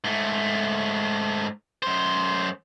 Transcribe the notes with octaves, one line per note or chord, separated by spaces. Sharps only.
G#2 A3
F#2 C5